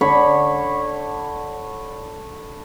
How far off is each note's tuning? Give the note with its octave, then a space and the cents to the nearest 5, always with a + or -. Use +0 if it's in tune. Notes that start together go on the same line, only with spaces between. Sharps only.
D3 +0 C#5 -15 B5 +0